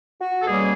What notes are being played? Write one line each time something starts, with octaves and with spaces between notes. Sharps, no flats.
F#4
A4
B2 G3 A#3 C#4 G#4